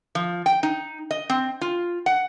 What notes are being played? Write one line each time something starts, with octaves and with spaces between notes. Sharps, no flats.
F3
G5
D#4
D#5
C4
F4
F#5